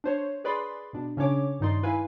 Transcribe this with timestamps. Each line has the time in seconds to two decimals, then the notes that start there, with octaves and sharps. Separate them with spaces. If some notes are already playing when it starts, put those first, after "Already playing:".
0.04 D4 C5 C#5
0.44 G#4 B4 D5 B5 C6
0.93 B2 D4
1.17 C#3 C#4 D4 C#5 D6
1.60 G2 D#3 D#4 D5 C6
1.83 E4 B4 F5 G#5